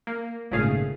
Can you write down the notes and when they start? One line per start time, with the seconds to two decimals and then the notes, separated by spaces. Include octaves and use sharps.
0.07 A#3
0.51 G#1 A#2 C#3 A3 G#4 F5